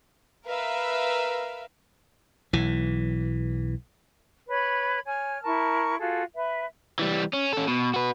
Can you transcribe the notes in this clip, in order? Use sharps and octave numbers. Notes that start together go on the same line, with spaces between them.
A#4 B4 E5 F5
B1 E3
B4 C#5 B5
C#5 G#5 F6
E4 A#4 A5 C#6
F4 F#4 G#4 A4
B4 E5
E3 G3
C#4
C#4 A4
B2
F#4 B4